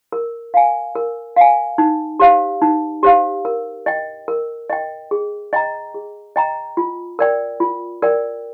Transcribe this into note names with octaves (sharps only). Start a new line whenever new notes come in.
A#4
F5 G#5
A#4
F5 G#5
D#4
G4 C5 F5
D#4
G4 C5 F5
A#4
D#5 G5
A#4
D#5 G5
G#4
D#5 G5 A#5
G#4
D#5 G5 A#5
F4
A#4 D5 G5
F4
A#4 D5 G5